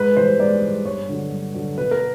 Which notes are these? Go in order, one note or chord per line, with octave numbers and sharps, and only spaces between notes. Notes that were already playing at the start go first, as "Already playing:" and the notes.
Already playing: G#2 B4
E3 G3 C5
G#2 D5
E3 G3
G2 C#5
D3 F#3
G2
D3 F#3
B2 B4
A#4